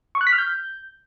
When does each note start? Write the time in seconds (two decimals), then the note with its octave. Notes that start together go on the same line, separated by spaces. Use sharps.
0.15 C#6
0.21 F#6
0.27 B6
0.33 F6
0.38 G6